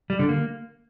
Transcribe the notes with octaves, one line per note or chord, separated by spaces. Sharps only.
G3
D3
A#3